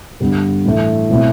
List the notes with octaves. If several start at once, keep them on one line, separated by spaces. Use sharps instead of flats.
G2 D3 G3 B3
A2 E3 A3
B2 F#3 A3 C4 E4